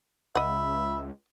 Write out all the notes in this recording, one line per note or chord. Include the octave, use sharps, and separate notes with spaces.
C#2 D#5 E5 F#5 B5